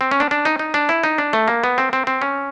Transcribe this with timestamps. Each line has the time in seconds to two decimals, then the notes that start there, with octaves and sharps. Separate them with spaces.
0.01 C4
0.11 C#4
0.20 D4
0.31 D4
0.45 D#4
0.59 D#4
0.74 D4
0.89 E4
1.04 D#4
1.18 D4
1.33 A3
1.48 A#3
1.64 B3
1.78 C4
1.93 C4
2.07 C4
2.22 C#4